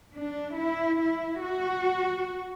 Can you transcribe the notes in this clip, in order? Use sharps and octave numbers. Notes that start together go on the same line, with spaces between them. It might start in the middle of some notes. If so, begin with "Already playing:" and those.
D4
E4
E4
F#4